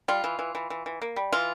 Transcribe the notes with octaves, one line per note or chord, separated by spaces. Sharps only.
G3 F4
E3
E3
E3
E3
E3
A#3
G3
E3 F4